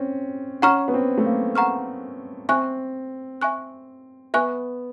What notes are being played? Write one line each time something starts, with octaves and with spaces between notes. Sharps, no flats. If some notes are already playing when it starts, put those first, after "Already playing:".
Already playing: C4 C#4
C#4 F#5 A#5 C#6 F6
B3
C4
A3
A#3
F#5 A#5 C#6 F6
C4 E5 G#5 C#6 F#6
E5 G#5 C#6 F#6
B3 E5 G#5 C#6 F#6